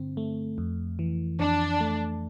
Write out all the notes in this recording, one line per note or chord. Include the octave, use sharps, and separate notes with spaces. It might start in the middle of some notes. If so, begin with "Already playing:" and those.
Already playing: G2 D3 C4
A3
F2
E3
F2 D4
A3